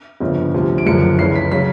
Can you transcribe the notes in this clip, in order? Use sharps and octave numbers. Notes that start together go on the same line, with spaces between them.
G1 F2 C#3 F3
D2 C3 F3
D7
F#1 F#2 D3 F3 A#3 C#7
C#2 C#3 E3 C7
B6
C#3 F#3 B6